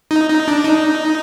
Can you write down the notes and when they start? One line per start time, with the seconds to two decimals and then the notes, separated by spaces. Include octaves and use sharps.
0.11 D#4
0.30 D#4
0.48 D4
0.64 D#4